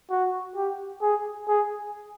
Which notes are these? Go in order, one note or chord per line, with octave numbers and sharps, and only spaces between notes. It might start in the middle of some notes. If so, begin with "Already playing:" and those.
F#4
G4
G#4
G#4